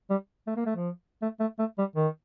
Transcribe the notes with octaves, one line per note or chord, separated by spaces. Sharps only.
G3
A3
A#3
A3
F3
A3
A3
A3
G3
D#3